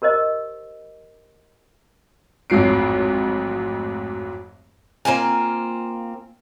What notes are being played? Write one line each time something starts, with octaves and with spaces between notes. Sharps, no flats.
G4 A#4 C5 D#5
A1 F2 G#2 F#3 C7 D7
A#3 C4 F4 G#5